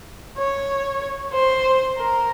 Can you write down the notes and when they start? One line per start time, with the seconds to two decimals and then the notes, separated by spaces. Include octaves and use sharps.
0.38 C#5
1.33 C5
1.97 A#4